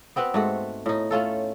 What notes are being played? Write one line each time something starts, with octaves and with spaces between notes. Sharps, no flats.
B3 C4 F#4 B4
G#2 A3 F#4
A2 D#4
A3 C#4 F4 A4